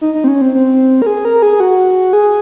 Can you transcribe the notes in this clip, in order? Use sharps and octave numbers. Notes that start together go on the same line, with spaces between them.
D#4
D#4
C4
C#4
C4
C4
A#4
G#4
A#4
G#4
F#4
G#4